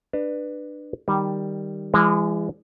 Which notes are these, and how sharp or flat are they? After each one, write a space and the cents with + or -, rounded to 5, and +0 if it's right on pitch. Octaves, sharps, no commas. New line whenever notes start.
D4 +25 B4 +0 A5 +30
D#3 +0 G3 +0
E3 +30 G#3 -25